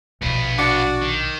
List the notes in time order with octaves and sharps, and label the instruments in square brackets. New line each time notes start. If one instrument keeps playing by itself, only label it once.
[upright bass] A#1 B2 [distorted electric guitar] G2 B3
[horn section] D4 F#4 [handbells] D6 C#7
[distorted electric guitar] D#3